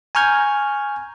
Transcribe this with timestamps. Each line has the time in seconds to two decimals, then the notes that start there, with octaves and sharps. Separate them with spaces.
0.15 G#5 A#5 C#6 F6 G6 G#6